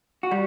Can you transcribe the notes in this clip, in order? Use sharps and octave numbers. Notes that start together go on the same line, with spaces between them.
F#4
G3